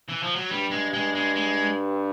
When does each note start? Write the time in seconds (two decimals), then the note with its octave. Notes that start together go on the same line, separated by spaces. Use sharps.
0.08 E3
0.23 F3
0.35 F#3
0.50 G2 G3
0.71 G#3
0.93 G2 G#3
1.15 G#3
1.36 G#3